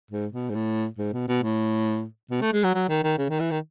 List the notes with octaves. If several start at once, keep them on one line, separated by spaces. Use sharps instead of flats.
G#2
B2
G#2
A2
G#2
B2
B2
A2
B2
A3
G#3
F#3
F#3
D#3
D#3
C#3
D#3
E3
D#3